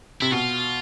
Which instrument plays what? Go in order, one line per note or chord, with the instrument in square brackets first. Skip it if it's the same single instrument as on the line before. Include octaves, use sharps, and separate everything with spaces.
[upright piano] C3 [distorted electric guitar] E4
[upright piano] B2 [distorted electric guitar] F4